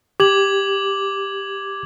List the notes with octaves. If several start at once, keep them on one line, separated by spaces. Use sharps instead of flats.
G4 D6 G#6 F#7